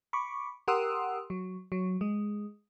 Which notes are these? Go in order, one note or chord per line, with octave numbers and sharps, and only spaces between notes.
B5 C#6 D6
G4 A#4 F#5 C6 D#6 E6
F#3
F#3
G#3